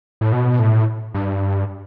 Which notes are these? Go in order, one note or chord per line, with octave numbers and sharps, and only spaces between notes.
A2
B2
A2
G2